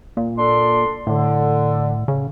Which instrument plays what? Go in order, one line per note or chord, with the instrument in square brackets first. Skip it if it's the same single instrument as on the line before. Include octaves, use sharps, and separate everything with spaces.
[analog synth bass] A#2
[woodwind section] D4 A4 C6
[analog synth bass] A2 [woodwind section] D3
[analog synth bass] C#3